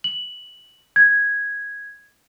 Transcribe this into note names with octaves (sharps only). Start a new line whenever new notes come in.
F#7
G#6